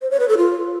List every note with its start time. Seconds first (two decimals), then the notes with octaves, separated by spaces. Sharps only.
0.02 C5
0.11 C#5
0.20 B4
0.29 A4
0.37 F4